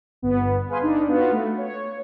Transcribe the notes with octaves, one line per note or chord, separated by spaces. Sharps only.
G1 B3
G#4 B4 F5 G#5 C6
D4 D#4
B3 F4 F#4
A3
C#5